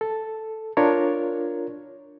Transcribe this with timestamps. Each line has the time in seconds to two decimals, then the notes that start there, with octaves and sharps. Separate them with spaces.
0.01 A4
0.77 D4 F4 A#4 C#5